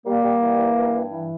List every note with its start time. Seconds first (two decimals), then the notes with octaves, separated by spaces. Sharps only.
0.06 G3 A#3
0.23 G3
0.42 E3
0.59 E3
0.77 G2
0.95 G2
1.12 E3